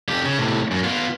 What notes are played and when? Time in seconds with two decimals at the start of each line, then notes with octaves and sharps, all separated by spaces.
0.09 F2 G4
0.25 C#3
0.39 A2 C3
0.71 F#2
0.84 B3 F4